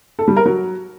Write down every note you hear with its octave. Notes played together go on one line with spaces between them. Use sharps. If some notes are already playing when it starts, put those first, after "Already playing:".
A4
G3
A#4
F#3